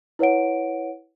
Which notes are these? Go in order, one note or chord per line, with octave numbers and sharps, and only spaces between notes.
E4 B4 C#5 F#5 D7